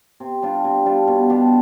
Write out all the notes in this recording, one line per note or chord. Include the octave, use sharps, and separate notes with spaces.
C3
G3 D4 F4
C3
G3 D4 F4
B2
B3 D4 G4